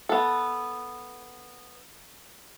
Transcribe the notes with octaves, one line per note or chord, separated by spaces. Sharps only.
B3 A4